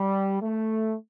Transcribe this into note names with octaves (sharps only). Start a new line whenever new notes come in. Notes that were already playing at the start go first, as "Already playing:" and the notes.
Already playing: G3
A3